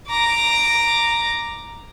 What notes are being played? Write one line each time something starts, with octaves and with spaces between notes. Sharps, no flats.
A#5 D6